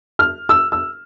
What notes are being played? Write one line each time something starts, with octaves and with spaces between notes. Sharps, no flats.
F6
E6
E6